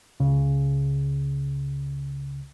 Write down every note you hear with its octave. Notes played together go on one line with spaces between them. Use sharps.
C#2 C#3